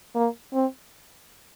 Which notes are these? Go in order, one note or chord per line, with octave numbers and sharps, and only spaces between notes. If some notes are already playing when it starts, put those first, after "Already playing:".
A#3
C4